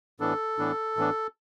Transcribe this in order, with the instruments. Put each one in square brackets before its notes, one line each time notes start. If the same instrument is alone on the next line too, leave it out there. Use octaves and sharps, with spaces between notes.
[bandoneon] A2 E3 B3 D4 A4
A2 E3 B3 D4
A2 E3 B3 D4